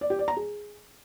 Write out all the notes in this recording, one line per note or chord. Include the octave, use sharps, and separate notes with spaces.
D5
G4
D5
A#5
G#4